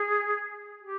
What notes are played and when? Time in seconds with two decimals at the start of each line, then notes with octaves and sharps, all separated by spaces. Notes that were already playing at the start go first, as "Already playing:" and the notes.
Already playing: G#4
0.81 G4